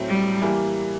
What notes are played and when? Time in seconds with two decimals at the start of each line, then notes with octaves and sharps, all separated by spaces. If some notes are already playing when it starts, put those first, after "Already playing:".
Already playing: A2 F#3 A3 C4
0.08 G3
0.42 E3 G3 A#3